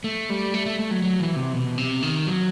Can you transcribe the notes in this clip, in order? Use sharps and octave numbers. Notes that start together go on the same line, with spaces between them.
A3
G3
A3
A3
A3
F#3
F#3
E3
C3
B2
C3
D#3
F#3